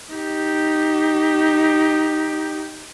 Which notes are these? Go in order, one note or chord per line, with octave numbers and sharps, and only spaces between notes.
D#4 G4